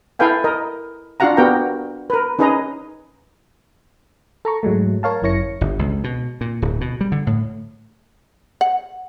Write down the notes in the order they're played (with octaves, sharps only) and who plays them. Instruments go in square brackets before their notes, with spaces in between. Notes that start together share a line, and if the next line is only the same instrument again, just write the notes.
[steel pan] E4 A4 B4 F5 G5 G#5
A#4 D#5
D4 F4 F#4 F5 F#5 A#5
B3 F#4 G4 A#4 G5 A#5
A#4 B4
C#4 D#4 G#4 B4 D#5 A#5
[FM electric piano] A4 A#5 C#6
G#2 F#3 G#3 A3
A#4 C#5 F5 A5
G1 F#2 E4 C#5 A#6 C#7
[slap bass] G1
C#2
B2
A#2
D1
B2
G3
D3
A2
[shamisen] F#5